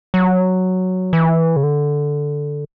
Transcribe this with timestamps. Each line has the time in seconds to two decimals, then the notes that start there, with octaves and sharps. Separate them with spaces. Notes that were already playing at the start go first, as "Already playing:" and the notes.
0.14 F#3
1.13 E3
1.56 C#3
1.63 D3